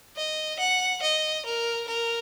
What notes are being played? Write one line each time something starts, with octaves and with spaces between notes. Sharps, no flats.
D#5
F#5
D#5
A#4
A#4